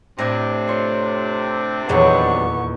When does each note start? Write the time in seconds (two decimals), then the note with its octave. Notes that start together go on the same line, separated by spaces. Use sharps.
0.19 A2 C3 C4 D4 E4 G#6 A#6
0.67 F4 C#5 C6
1.89 D#1 E2 A#2 F#3 B3 G#4 C#5 C#6